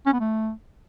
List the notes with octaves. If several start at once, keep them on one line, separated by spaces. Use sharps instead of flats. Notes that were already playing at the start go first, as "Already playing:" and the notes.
C#4
B3
A3